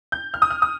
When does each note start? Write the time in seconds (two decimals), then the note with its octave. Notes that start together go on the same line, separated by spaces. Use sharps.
0.12 G6
0.34 F6
0.42 D#6
0.50 F6
0.62 D#6